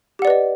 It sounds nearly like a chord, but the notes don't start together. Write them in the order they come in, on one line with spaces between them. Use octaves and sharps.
G4 F#5 D5 B4 D#5